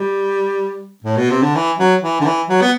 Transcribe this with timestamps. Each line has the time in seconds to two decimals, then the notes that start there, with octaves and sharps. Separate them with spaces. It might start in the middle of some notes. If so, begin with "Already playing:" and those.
Already playing: G3
1.04 A2
1.17 B2
1.30 C3
1.43 D3
1.55 E3
1.79 F#3
2.02 E3
2.21 D3
2.26 E3
2.48 F#3
2.61 B3